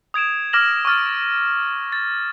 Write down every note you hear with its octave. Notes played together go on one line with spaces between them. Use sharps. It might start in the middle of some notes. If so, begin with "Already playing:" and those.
D#6 G#6 D7 E7
D6 F6 G#6 A#6 E7 F#7
C#6 D6 F6 A6
A6